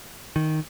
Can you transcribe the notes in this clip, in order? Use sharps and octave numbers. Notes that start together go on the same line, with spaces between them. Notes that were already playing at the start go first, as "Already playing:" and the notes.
D#3